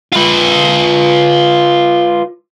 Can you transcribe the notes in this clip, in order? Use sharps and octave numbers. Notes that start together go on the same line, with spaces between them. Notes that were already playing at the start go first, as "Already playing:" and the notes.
F4 B4